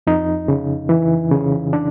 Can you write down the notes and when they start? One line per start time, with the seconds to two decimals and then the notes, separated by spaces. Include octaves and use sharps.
0.07 F2 D#4
0.48 C#3
0.89 E3
1.31 C#3
1.73 D4